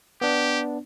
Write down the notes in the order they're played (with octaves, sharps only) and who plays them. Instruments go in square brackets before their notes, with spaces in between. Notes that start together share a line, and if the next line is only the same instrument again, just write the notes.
[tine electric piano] B3 D4 [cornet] G4